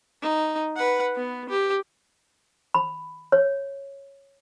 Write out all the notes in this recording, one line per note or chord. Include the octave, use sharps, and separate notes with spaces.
D#4
B4 F#5
B3
G4
B5
C#5